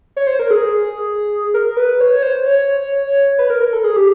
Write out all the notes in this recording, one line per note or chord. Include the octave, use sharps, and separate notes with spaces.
C#5
C5
A#4
G#4
A#4
B4
C#5
C5
C#5
B4
A#4
A#4
A4
G#4
G4